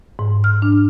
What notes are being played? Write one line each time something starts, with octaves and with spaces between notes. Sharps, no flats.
G#2
F6
D4